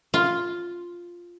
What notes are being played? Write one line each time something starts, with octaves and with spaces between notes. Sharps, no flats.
F4